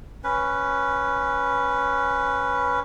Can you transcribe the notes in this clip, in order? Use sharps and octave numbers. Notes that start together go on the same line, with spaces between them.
C#4 B4